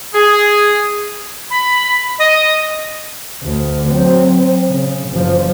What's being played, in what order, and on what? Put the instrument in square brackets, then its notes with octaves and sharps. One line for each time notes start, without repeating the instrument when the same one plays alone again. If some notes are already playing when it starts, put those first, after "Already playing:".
[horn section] G#4
[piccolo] B5
D#5
[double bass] D2
F#3 C4
C#3
F#1 F3